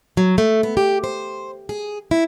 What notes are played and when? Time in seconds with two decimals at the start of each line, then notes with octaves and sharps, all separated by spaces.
0.17 F#3
0.38 A3
0.63 B3
0.77 G4
1.04 C5
1.69 G#4
2.11 E4